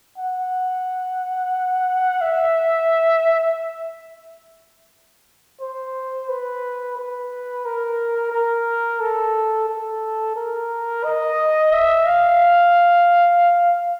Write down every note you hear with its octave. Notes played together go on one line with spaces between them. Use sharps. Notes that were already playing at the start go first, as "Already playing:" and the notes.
F#5
E5
C5
B4
B4
A#4
A#4
A4
A4
A#4
D#5
E5
F5